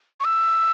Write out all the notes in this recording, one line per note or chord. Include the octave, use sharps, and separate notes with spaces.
C#6
E6